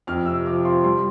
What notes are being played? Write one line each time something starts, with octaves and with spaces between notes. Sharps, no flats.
F2 F6
C3 E6
F3 D6
F3 C6
G3 C6